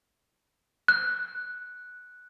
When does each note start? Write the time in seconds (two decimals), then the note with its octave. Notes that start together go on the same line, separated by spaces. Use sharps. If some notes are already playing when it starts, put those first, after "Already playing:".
0.88 F#6